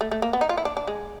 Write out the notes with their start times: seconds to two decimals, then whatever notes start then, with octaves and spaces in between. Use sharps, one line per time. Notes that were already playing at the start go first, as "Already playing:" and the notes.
0.01 A3
0.11 A3
0.22 A#3
0.33 B3
0.41 D#4
0.49 F4
0.57 E4
0.65 D4
0.77 D4
0.87 G#3